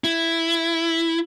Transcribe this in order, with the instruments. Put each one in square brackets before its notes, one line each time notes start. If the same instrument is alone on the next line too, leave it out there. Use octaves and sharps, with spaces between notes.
[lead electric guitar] E4